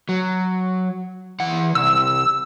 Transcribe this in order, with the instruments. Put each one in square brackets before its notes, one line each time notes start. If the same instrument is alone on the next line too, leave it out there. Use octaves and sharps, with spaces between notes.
[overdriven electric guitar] F#3
E3 F#5
[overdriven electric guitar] C2 [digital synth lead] E6